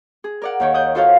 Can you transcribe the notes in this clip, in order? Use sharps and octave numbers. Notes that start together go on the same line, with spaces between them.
G#4
A#4 D5 F#5
D#2 D#3 C#5
D#6 F#6 G6
F4 F#4 A4 C5 C#5 F5